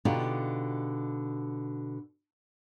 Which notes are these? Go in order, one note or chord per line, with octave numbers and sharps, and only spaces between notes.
B2 D3 D#4 F4 G4